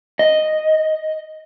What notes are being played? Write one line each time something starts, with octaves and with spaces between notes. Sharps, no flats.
D#5